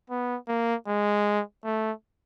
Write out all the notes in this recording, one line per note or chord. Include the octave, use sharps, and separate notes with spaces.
B3
A#3
G#3
A3